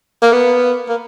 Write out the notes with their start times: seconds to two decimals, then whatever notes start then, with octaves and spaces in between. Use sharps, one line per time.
0.22 A#3
0.33 B3
0.89 A#3